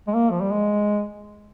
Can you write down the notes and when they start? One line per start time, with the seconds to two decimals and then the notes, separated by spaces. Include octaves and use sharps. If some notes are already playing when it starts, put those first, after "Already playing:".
0.07 G#3
0.14 A#3
0.31 F3
0.41 G3
0.51 G#3